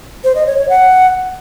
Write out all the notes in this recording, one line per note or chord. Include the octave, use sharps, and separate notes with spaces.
C5
D#5
C#5
C#5
F#5